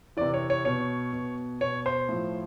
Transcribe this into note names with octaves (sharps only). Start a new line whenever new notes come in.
C3 E3 D5
C#5
C#5
B2 C#5
B2
B2 C#5
C5
A2 F3